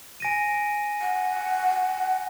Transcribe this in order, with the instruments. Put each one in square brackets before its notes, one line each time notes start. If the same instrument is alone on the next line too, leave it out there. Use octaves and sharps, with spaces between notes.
[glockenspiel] G#5 A#6 D#7
[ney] F#5